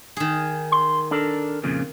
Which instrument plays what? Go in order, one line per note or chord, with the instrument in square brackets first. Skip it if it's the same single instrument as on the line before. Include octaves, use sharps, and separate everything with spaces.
[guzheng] D#3 G#4
[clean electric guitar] C6
D4 A4 A#4
F2 A#2 C#3